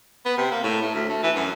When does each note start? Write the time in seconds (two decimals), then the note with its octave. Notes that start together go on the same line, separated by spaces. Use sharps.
0.25 B3
0.37 C3
0.52 A#3
0.63 A2
0.82 A3
0.94 D2
1.09 A3
1.23 E3
1.35 F#2